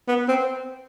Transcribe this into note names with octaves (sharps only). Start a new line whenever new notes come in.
B3
C4